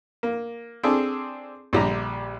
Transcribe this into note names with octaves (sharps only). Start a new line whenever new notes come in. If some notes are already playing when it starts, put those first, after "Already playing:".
A#3
C4 D4 G#4 A4
A#1 D3 G3 G4 A#5